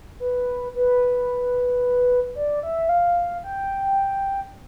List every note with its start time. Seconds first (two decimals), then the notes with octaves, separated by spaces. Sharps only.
0.20 B4
0.75 B4
2.35 D5
2.63 E5
2.89 F5
3.44 G5